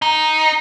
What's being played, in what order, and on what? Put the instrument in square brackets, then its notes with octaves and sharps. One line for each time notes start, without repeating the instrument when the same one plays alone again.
[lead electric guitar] D#4